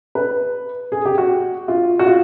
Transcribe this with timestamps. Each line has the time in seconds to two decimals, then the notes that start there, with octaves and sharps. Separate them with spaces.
0.15 B4
0.92 G#4
1.05 G4
1.18 F#4
1.68 F4
1.99 F#4
2.07 F4